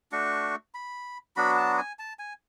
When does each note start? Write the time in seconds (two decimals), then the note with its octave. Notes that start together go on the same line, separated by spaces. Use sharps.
0.12 A3 D4 F#4 C#6
0.74 B5
1.36 F#3 B3 D4 F#4 B5
1.58 A5
1.78 G#5
1.99 A5
2.19 G#5